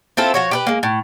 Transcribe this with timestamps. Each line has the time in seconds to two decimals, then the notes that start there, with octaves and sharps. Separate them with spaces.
0.17 C4 E4 F4 A4
0.34 F3 F#4 C#5
0.51 G4 A#4 B4
0.66 G#3 A#3
0.83 A2